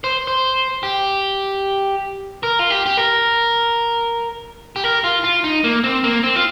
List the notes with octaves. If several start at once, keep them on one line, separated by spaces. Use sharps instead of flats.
C5
C5
G4
A#4
F4
G4
G4
A#4
G4
A#4
F4
F4
D#4
A#3
C4
A#3
C4
F4